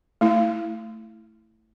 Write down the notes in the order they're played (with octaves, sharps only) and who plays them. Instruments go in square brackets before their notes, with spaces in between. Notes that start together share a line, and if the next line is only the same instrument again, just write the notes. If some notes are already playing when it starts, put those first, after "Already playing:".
[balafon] A3 E4